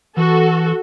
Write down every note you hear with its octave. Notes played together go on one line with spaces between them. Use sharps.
E3 F#4 A4